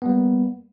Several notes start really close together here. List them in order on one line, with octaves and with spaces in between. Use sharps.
B3 G3 A#3